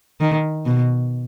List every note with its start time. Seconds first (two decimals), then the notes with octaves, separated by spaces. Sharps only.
0.21 D#3
0.66 B2